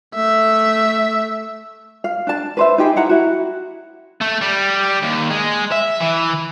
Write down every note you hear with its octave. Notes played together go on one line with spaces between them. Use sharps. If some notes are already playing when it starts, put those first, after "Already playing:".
A3 E5
F5
D4 A5
B4 C5 E5
D#4 G4 G#4
E4 F#5 A#5
E4 F#4
A3
G3
D#2
G#3
E5
E3